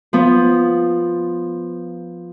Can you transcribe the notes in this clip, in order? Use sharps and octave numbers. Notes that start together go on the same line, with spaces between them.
F3 B3